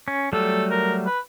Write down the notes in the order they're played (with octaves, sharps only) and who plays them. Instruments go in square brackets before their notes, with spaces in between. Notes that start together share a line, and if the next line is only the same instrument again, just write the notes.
[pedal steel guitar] C#4
[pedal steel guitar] F#3 G3 A3 [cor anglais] A4
[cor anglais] A#4
B4